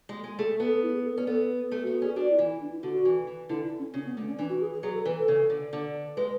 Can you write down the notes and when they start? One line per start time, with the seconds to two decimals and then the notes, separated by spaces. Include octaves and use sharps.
0.09 G#3
0.24 G#3
0.38 A3 G#4
0.52 A4
0.60 B3
0.68 A4
0.82 E4
0.94 G#4
1.05 A4
1.16 C#4 B4
1.27 B3 A4
1.71 A3 A4
1.83 F#4
1.87 B3
1.94 F#4
2.02 C#4 G#4
2.16 D4 F#4
2.31 E4
2.39 E3
2.46 E4
2.61 D4
2.72 E4
2.83 D3 F#4
2.93 F#4
3.05 E3
3.27 E3
3.49 D3 E4
3.64 E4
3.79 C#4
3.94 C#3 C#4
4.06 B3
4.16 D3 A3
4.27 C#4
4.39 E3 D4
4.49 F#4
4.61 G#4
4.73 G#4
4.83 F#3 G#4
4.94 A4
5.05 E3 B4
5.17 A4
5.28 C#3
5.50 D3
5.73 D3
6.17 G#3 B4